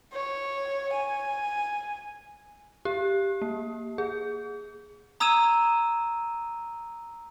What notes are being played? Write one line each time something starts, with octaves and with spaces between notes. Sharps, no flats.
C#5
G#5
G4
A#3
G#4
A#5 D#6 E6 G#6 D#7 E7